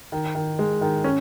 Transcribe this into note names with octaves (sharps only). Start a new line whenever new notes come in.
D#3
D#3
G#3
D#3
C#4